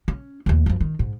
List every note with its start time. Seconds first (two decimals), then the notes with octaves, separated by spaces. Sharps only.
0.08 C#4
0.46 D#2 A3
0.66 F#2 F3
0.80 D#3
0.99 G#2